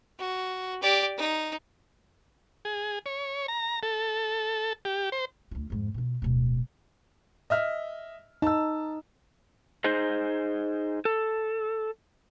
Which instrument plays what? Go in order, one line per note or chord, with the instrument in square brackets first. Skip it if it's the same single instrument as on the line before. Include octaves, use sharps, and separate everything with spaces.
[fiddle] F#4
G4 D5
D#4
[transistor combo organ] G#4
C#5
A#5
A4
G4
C5
[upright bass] D2 F4
F2 G#2
B2 F4
D1 B2
[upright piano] D#5 E5 F6
[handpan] D#4 [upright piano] A5 E6
[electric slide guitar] D#4 G#4 C5 D#5
A4